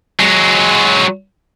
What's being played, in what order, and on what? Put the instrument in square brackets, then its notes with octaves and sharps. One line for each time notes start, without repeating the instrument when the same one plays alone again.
[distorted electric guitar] F#3 G#3